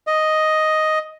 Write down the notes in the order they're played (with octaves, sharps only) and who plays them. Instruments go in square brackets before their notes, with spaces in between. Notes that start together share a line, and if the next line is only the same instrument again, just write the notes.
[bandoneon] D#5